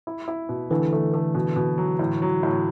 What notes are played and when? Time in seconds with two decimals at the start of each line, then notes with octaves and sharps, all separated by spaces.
0.07 E4
0.28 E4
0.49 B2
0.71 D3 E3 A3
0.93 A3
1.14 A3
1.35 B2
1.56 B2
1.78 F#3
1.99 A2
2.22 F#3
2.43 A2